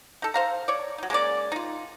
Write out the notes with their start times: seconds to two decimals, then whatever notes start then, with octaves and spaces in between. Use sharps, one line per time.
0.22 D#4 A4
0.34 C5 F5 A#5
0.68 C#5 D5
0.98 F#3 D#4
1.10 G#3 A#3 C#4 D5
1.52 D#4 F4